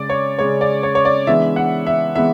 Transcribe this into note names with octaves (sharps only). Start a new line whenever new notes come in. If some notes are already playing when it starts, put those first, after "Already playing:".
Already playing: C#3 G#3 C#4 D5
C#5
C#3 G#3 C#4 C#5
D5
C#5
C#5
D5
E3 G#3 B3 D4 E5
F#5
E5
E3 G#3 B3 E5